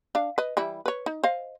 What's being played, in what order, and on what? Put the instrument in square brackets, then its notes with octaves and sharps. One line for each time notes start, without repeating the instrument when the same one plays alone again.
[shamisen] D4 F5
B4 D#5
E3 G3 E4
B4 C#5
D#4
C5 D#5 F5